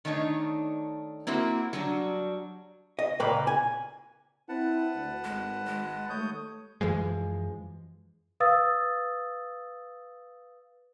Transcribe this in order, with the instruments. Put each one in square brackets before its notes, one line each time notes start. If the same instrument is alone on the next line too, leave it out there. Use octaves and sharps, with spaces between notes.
[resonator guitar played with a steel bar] D#3 A3 D4 D#4 C#5
A#3 C4 E4 F#4
F#3 G3 D4 F#4
[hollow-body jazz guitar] D#5
C#2 A#2 A#3 B4 G5
G#5
[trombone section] C4 E4 [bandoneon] B4 F#5 A5
[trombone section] D2
[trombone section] G#1 [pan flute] G#3
[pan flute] G#3
[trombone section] D#2 A3 [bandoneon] C#5 D#6 G6
[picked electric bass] F#2 E3 F3 G#3
[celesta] B4 F5 D#6 E6 A6